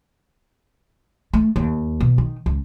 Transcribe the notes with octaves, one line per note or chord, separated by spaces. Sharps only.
A3
D#2
B2
D#3
C#2